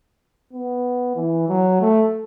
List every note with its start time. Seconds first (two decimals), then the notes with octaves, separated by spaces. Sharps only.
0.53 B3
1.16 E3
1.48 F#3
1.81 A3